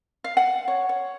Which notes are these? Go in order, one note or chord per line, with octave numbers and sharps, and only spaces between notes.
F5
F#5
C#5
C#5